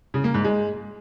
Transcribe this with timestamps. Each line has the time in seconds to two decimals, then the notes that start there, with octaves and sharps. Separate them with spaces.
0.14 C#3
0.24 A#3
0.34 G#2
0.44 G#3